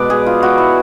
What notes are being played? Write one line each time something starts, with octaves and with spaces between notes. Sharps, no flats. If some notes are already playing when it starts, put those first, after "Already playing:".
Already playing: B2 G#3 B4 D5
G#4
F4
F#4
E4